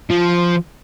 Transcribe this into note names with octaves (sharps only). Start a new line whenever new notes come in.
F3